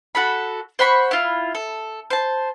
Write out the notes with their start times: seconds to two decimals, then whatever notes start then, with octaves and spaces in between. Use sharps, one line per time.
0.15 F#4 A4 B5
0.79 C5 F#5 B5 C#6
1.11 E4 F4
1.55 A4
2.10 C5 A5